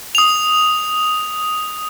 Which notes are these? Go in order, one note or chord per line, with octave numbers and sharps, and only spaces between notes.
D#6 F7